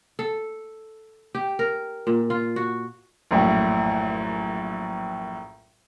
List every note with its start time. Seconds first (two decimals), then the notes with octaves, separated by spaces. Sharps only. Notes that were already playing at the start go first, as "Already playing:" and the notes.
0.19 A4
1.35 G4
1.59 A#4
2.07 A#2
2.30 F4
2.56 F#4
3.31 A#1 F#2 A2